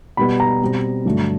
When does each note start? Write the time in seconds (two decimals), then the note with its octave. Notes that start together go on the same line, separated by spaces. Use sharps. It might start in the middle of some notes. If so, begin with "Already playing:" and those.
0.17 B2 G3 B3 B5
0.40 A#5
0.62 B2 G3 C4
1.05 G2 D3 F#3 A3